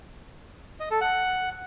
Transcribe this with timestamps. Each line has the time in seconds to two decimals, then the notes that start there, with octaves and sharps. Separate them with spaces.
0.80 D#5
0.91 A4
1.01 F#5